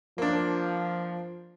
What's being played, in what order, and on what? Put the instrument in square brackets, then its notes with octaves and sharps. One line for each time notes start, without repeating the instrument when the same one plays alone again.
[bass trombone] F3 [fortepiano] A#3 D4